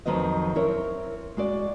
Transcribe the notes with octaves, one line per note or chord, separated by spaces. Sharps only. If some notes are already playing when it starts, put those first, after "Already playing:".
F2 D#3 F#3 C4 B4 D#5
C4 E4 A#4 C#5
G#3 F#4 D5